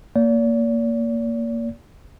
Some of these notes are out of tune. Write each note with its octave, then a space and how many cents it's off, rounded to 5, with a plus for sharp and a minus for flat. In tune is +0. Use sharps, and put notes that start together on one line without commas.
A#3 -10 D5 -40